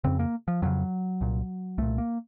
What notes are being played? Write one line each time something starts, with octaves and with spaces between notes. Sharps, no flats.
F2 C#3 C4
A#3
F3
F2 C#3 F#3
C2 A#2
C2 A#2 A3
A#3